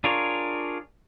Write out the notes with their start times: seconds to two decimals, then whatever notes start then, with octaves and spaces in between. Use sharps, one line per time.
0.04 D4 F4 G#4 A#4 C#5